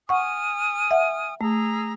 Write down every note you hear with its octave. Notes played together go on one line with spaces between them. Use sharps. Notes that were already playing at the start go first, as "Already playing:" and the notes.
F#5 G#5 C#6 D#6 F6
E5 F#5
A3 G#4 A#5 E6